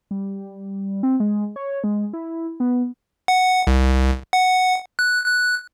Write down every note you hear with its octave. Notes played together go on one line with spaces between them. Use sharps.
G3
C4
G#3
C#5
G#3
E4
B3
F#5
C2
F#5
F#6
F#6